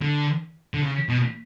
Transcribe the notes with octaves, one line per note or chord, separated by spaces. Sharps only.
D3
D3
C#3
B2